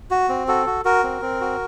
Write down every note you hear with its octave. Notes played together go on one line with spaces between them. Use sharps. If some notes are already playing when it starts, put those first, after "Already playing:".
F#4
C4
F#4 A4
F#4
F#4 A#4
C4
C4
F#4